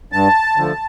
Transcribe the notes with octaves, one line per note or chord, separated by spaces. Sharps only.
G2 A5
D3 F3 A3